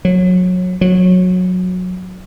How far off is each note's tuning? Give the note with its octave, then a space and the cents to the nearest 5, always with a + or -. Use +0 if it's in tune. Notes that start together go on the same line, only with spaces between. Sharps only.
F#3 -25
F#3 -20